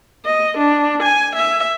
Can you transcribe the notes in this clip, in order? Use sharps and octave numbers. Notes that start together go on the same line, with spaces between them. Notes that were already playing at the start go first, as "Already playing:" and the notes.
D#5
D4
G#5
E5